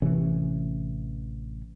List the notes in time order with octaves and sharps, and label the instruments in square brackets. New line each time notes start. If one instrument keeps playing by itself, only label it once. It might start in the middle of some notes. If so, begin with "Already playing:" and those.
[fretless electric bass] A1 C3 E3 C#4